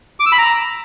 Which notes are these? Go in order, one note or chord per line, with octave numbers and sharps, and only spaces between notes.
D6
E6
B5
A#5